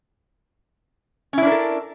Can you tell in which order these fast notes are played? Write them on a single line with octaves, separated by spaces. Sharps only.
C#4 E4 D4 A#4 A4